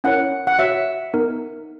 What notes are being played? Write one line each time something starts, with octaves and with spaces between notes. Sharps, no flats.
C#4 E4 A#4 C#5 F#5
F#5
F#4 C#5 E5 F#5
B3 D#4 A#4